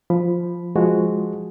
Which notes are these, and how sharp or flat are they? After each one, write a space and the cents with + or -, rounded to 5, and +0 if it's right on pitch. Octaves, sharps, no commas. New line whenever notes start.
F3 +0 B5 +0
F3 +0 G#3 +0 F#4 -5